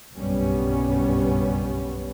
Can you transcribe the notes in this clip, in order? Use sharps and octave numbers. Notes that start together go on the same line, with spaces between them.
F#1 B1 G2 G3 B3 C#4